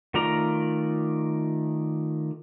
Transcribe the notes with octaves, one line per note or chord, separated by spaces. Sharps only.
D#3 A3 F4 D5 A#5